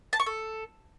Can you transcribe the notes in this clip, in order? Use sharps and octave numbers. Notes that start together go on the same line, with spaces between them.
A5
C#6
A4